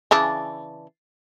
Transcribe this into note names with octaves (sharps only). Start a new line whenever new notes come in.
C#3 E3 D4